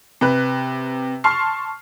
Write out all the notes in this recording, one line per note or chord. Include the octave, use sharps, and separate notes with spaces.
C3 B4 F#6
A5 C6 C#6 F6 C7